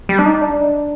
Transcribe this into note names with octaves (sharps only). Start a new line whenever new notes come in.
G3
D4
D#4
D4